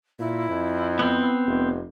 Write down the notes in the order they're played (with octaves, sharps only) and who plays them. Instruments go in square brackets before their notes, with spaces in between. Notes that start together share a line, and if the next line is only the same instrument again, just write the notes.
[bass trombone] A#2 [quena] E4
[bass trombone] F2
[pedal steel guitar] B3 C4
[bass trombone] F1